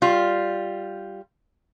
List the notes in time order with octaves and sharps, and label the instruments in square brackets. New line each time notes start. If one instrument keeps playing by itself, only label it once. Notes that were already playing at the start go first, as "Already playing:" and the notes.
[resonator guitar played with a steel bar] G3 F4